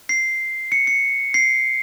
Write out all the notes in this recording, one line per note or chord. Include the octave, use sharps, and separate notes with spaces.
C7
C#7
C#7
C7